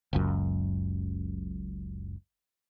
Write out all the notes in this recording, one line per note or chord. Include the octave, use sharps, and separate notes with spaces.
F#1 C#2 F#2